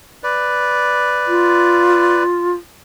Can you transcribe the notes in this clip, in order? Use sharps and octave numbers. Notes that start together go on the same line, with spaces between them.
B4 D5
F4